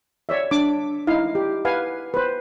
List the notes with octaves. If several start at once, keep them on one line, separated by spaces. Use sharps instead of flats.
C#5 D5 E5
D4 D6
D#4 E4 F5
G4
B4 F5 F#5 G#5
B4 C5